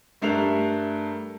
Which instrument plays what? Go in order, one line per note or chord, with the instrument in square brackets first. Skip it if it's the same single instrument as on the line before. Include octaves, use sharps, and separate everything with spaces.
[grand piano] G2 A3 D4 A#4 C7 F7